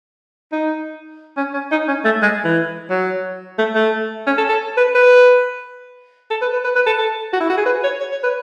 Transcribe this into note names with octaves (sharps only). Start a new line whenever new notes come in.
D#4
C#4
C#4
D#4
C#4
A3
G#3
E3
F#3
A3
A3
C#4
A4
A4
B4
B4
A4
B4
B4
B4
B4
A4
A4
F#4
E4
F#4
G#4
B4
C#5
C#5
C#5
B4